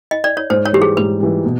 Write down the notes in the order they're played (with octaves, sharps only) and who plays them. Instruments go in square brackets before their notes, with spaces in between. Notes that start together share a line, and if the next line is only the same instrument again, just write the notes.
[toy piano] D#5
D5
C#5
[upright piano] G#2 [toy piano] C5
[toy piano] C#5
[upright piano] E3 G3 [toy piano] G4
[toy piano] G#4
[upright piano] G#2 [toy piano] B4
[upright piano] E3 G3
B2